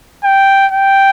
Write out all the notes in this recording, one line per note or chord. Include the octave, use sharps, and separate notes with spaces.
G5
G5